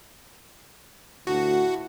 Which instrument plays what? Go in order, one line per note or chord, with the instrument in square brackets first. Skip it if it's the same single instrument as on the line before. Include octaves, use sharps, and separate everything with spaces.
[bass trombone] D2 [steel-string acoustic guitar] A2 [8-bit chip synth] F#4